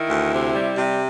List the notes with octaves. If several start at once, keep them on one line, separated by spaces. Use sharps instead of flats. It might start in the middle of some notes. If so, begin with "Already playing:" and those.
Already playing: D#3 E4
D2
C3
G3
C3